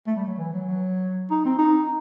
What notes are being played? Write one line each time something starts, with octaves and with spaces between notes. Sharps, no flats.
A3
G3
F#3
E3
F#3
F#3
D#4
C4
D#4